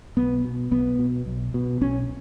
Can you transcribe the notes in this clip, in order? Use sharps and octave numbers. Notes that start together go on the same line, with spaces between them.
B1 B3
B2
B1 B3
B2
B1
B2
B1 C#4